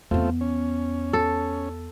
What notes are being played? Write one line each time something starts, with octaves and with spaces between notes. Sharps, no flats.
E2 A3 B3 C4 F4
C#4
A4